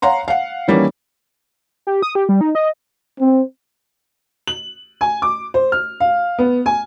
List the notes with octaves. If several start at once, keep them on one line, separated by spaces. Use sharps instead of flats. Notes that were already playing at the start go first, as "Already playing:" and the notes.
C#5 F5 F#5 A#5 C6
F5 F#5
D#3 E3 G3 A#3 C#4 E4
G4
D#6
G4
G3
D#4
D#5
C4
F#7
G#5
D6
C5
F6
F5
B3
G#5